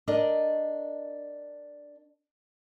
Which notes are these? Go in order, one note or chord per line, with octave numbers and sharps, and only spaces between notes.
D4 A#4 D5 D#5